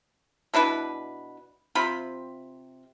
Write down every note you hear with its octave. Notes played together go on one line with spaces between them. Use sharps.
B2 D4 E4 B4
C3 C4 F4 B5